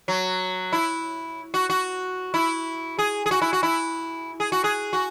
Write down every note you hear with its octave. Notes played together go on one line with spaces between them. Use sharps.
F#3
E4
F#4
F#4
E4
G#4
G#4
F#4
E4
F#4
E4
G#4
F#4
G#4
F#4